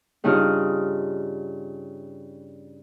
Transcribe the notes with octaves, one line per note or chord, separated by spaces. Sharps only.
G2 C#3 D#4 F4 D#6 F6